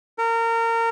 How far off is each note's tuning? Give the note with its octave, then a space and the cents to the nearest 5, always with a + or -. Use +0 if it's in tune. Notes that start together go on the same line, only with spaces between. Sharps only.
A#4 -25